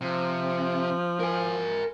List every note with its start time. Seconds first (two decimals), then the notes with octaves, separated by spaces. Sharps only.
0.01 C3 F3
1.20 A#4 G#5